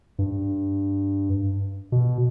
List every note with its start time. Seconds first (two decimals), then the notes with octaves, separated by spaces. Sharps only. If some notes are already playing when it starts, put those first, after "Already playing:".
0.19 G2
1.92 B2